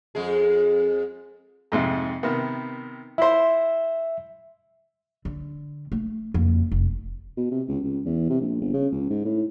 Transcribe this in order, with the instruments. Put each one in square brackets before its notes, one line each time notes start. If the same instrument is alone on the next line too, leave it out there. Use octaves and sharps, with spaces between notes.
[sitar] F2 G#3 G#4
[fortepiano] F2 G#2 C3
C3 D#3 B3
[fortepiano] E4 C5 [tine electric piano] E5
[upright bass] D3
A3
F#1 F2
F1
[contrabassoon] B2
C3
C#2
C#2
E2
C3
A#1
G1
C#3
C#2
G#2
A2